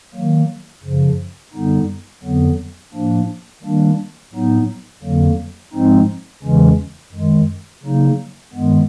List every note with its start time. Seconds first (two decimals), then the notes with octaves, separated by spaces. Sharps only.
0.14 D#3 F#3 A#3
0.84 F#2 C#3 F3
1.54 F#2 D3 G3 B3 D#4
2.23 F2 D3 F#3 B3
2.94 A2 F3 A#3 D4
3.63 D#3 G3 A#3 D4
4.33 A2 F#3 B3 D#4
5.03 F2 D3 F#3 A#3
5.73 G#2 F3 G#3 C4 D#4
6.43 E2 C#3 E3 G#3 C#4
7.13 F#2 D#3 G#3
7.83 C#3 F#3 A#3 D#4
8.53 G2 D#3 G#3 B3